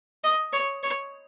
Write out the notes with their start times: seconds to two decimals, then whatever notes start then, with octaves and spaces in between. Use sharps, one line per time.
0.24 D#5
0.53 C#5
0.83 C#5